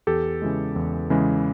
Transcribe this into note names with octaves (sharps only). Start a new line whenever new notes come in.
E2 G4 A4
C#3 E3 G#3
E2
C#3 E3 G#3